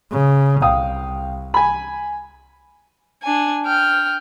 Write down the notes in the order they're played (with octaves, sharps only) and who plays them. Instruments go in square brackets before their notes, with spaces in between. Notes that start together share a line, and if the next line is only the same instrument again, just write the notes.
[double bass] C#3
[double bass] C2 [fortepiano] F5 G5 D#6
[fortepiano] G#5 B5
[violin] D4 G#5
G5 F6